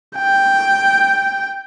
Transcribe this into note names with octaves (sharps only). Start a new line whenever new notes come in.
G5